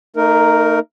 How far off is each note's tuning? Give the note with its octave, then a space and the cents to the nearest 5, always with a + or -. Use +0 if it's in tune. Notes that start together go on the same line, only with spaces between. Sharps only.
A3 +40 D#4 -5 A#4 +0